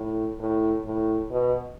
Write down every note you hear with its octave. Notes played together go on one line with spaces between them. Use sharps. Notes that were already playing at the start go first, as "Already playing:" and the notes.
Already playing: A2
A2
A2
B2